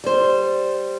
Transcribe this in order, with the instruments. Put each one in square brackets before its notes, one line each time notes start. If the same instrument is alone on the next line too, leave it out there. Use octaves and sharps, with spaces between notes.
[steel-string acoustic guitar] G3 C5